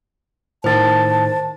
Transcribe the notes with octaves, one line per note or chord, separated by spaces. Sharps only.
A2 D#3 C5 A5 A6